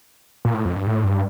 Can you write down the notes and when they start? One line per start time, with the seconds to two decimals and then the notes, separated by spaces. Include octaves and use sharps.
0.45 A#2
0.54 A2
0.65 F2
0.76 G2
0.87 A2
1.04 G2